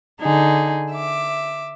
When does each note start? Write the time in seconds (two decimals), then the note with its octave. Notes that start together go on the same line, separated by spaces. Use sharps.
0.21 D3 D#4 G#4
0.93 E5 D6